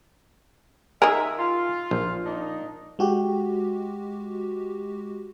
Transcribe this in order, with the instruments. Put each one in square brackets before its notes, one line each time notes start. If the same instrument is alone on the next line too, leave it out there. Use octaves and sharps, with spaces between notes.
[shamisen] D#3 G#4 [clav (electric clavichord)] A#4 [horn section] E5
[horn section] F4
[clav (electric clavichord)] A#1
[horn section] A#3 D4 D#4
[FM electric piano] G#3 F#4 G4